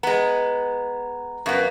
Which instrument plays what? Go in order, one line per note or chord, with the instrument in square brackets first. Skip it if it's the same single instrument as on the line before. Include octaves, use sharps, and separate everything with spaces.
[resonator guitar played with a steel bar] G#3 B3 [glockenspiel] A#5
[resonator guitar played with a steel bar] F#2 A#3 B3